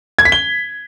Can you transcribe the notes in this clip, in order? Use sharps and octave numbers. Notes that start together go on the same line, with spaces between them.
G#6
B6
G7